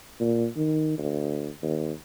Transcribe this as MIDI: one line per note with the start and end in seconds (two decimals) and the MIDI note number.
0.20 0.47 46
0.56 0.95 51
0.98 1.49 38
1.63 1.92 39